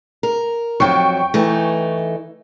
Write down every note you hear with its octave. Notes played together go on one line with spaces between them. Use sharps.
A#4
F2 F#3 G5 C#6
E3 A3 D#4